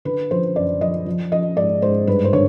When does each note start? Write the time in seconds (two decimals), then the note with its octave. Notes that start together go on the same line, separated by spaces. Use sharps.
0.05 D3 B4
0.31 F3 C5
0.56 F#2 D5
0.81 F3 D#5
1.06 F3
1.32 F3 D#5
1.57 G#2 D5
1.82 G#2 C5
2.07 G2 B4
2.24 C5
2.33 D3 C#5